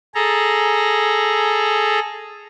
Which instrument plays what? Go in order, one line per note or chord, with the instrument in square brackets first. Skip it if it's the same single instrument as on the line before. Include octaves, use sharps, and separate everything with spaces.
[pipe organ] G#4 A4 A#5